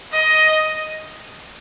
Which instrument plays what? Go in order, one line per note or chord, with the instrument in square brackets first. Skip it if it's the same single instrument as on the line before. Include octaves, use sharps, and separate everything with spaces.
[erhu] D#5